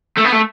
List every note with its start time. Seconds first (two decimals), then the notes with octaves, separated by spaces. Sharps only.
0.17 A3
0.24 B3
0.32 A3